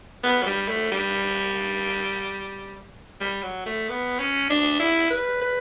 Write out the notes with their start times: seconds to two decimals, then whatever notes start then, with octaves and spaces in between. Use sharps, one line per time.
0.23 B3
0.42 F#3
0.46 G3
0.68 A3
0.92 G3
3.20 G3
3.42 F#3
3.66 A3
3.89 B3
4.19 C#4
4.50 D4
4.79 E4
5.10 B4
5.41 B4